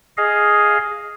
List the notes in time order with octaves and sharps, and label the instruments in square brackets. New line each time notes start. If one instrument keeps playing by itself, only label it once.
[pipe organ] G#4 D#5 F5